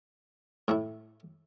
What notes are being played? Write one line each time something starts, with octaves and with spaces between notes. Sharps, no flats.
A2 A3 E4